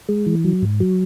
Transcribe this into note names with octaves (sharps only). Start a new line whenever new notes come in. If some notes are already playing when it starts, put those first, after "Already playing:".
G#3
E3
F#3
G#2
F#3